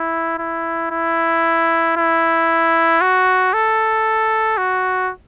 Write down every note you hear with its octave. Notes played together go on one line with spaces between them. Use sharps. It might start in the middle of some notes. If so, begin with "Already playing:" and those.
Already playing: E4
E4
E4
E4
F#4
A4
F#4